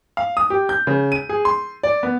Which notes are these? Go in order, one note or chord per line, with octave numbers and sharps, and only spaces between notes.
F5
D#6
G4
G6
C#3
D#7
G#4
C6
D5
B3